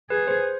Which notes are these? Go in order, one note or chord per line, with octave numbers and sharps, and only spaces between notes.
G#4 B4
C5